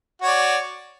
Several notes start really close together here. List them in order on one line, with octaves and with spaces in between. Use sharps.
F#4 C#5 D5